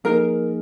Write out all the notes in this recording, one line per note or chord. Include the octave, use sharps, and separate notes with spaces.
F3 A#3 D#4 G#4 A#4